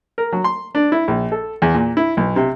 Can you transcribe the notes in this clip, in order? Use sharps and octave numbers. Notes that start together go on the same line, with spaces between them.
A#4
F#3
C6
D4
E4
A#1
A4
E2
A#2
E4
B1
C3